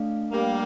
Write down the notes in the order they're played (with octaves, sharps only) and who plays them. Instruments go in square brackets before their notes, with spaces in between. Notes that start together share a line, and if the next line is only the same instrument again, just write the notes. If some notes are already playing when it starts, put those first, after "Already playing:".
Already playing: [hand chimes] A3 D4 A4 D5 F5
[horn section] G3 A#3